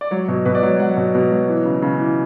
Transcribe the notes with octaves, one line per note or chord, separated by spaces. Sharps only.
D5
F#3 C#5
B2
B2 B4
D5
F#3 C#5
F#3 F#5
B2
B2
F#3
E3
C#3
C#3
E3